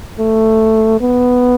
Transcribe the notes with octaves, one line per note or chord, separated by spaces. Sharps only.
A3
B3